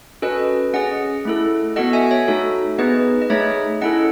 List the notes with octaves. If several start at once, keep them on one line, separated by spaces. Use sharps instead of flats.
C#4 F#4 A4 B4 D#5
C#4 G#4 D#5 F#5
A3 E4 A4
B3 F#4 A4 D#5 F#5
E5 G#5
C#5 E5
A3 D#4 F#4 A4
B3 D#4 G#4 B4 D#5
D#5
A3 D#4 G#4 C#5 E5
C#4 E4 A4 D#5 F#5